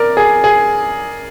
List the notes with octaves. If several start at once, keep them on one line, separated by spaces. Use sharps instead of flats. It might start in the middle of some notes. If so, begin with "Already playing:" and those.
Already playing: A#4 D5
G#4
G#4